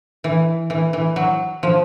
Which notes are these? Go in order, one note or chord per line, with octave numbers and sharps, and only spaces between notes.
E3
E3
E3
F#3
F3